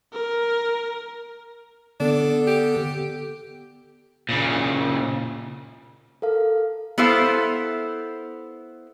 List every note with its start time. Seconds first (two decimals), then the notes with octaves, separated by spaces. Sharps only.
0.13 A#4
2.00 D3 B3 D4 A4
2.47 G4
4.29 A#2 C#3
6.22 A4 A#4 F5
6.98 B3 E4 A4 C5 F5